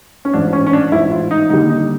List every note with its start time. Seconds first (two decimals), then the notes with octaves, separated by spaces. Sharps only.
0.25 C#4
0.34 A1 G#2 F3 D4
0.53 C#4
0.67 C#4
0.73 D4
0.92 A1 G#2 F3 E4
1.12 F4
1.31 D#4
1.50 D#2 D3 G3 A#3 D#4
1.70 D#4